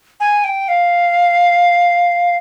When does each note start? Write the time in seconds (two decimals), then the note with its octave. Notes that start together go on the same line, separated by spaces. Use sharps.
0.20 G#5
0.44 G5
0.68 F5